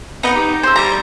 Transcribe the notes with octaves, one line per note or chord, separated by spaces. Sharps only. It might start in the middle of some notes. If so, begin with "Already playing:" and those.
B3 D#4
G4
C5 E5
G3 A#5